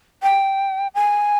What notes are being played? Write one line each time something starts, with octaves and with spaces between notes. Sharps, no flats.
G5
G#5